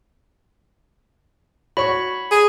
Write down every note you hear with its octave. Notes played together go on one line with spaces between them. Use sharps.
F#4 C#5 B5 C#6
G#4